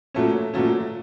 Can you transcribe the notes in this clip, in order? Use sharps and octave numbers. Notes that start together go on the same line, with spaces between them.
A#2 F#3 A3 C#4
A#2 F#3 A3 C#4